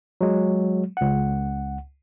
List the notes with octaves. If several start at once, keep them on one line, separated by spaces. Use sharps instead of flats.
F#3 G#3
C#2 F#5